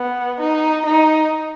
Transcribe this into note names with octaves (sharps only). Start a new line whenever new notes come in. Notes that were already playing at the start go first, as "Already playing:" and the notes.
Already playing: B3
D#4
D#4